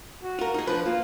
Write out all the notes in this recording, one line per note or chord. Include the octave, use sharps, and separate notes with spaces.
F#4
F4 A#4
D#4 G#4
F3 D4 B4
A#3 F4